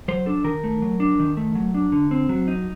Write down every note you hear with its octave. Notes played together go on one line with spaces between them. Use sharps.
F#3 C5
D4 A4
D#3 A#4
A3
F#3
D4
D#3
A3
F#3
D4
D3
C4
F#3
D#4